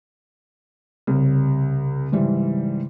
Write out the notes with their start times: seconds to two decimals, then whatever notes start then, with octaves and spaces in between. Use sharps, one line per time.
1.07 C2 C#3
2.12 G#2 E3 G3